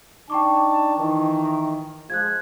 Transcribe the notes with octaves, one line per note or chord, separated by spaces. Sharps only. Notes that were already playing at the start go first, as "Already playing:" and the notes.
D4 D#4 G5 A5 C#6 D6
D#3 E3
F3 G#3 F#6 G#6